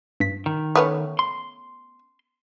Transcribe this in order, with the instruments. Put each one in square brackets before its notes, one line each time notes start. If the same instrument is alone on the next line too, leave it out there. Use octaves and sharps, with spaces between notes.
[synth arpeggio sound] G2 B6
[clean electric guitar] D#3
[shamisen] A3 B3 C#4 [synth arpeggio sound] D#6 F6
[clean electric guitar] C6